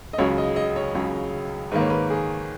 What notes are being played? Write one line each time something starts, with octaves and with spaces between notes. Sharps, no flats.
D#5
C#2 C#3 F#3 C#5
D#5
D#5
C#5
C#2 C#3 F#3
G#2 D#3 A#3 B4
C#5
B4
G#4